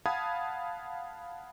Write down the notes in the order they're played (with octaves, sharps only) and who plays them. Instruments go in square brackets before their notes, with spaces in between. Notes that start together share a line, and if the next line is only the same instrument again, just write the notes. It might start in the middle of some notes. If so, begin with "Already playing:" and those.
[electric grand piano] F5 F#5 A5 B5 D#6 G#6